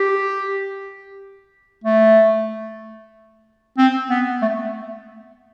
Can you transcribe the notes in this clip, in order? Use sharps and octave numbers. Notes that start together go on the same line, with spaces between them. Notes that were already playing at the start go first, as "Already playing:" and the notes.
Already playing: G4
A3
C4
B3
A3